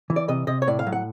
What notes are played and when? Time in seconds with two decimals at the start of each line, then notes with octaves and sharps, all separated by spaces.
0.10 E3
0.16 D5
0.28 C3 D#5
0.47 C3 D#5
0.62 C#5
0.67 A2 D5
0.79 F5
0.87 F#3
0.92 F#5